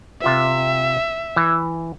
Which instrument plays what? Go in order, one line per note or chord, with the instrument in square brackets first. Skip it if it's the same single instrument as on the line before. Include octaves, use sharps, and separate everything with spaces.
[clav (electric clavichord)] C3 F4 B4 [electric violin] E5
[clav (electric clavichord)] E3